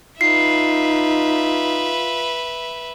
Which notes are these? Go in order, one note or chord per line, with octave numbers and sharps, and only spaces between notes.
D#4 F4 B4 E5 C7